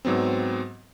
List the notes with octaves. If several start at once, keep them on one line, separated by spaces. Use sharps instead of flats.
G#2 F#3 B3 C4